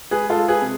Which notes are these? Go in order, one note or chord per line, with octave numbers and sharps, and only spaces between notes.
G#3 G#4 B4
F4 A4
G#3
G#4 B4
C3